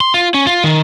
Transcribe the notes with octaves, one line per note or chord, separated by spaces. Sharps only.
C6
F4
C#4
F4
D#3